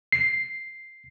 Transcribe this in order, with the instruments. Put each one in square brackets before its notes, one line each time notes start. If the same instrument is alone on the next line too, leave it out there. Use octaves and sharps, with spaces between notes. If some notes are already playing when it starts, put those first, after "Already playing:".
[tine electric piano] C7